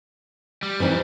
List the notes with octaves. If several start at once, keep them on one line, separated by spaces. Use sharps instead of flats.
G3
F2 E3 G3 C4 D#4